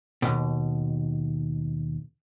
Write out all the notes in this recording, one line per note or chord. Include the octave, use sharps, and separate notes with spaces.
D#2 B2